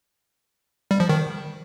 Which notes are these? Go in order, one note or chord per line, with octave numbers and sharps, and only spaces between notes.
G3
F3
D#3